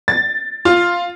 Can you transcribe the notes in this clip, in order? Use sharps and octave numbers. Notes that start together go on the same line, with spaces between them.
A6
F4